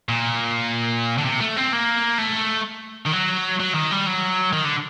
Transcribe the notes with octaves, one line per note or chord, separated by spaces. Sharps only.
A#2
D3
C3
A3
C4
A#3
A3
D#3
F#3
F#3
D#3
G3
F#3
D#3
D3